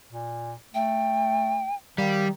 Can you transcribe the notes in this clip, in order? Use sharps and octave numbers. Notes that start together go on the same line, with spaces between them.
A#2
A3 G5
D#3 G3 F5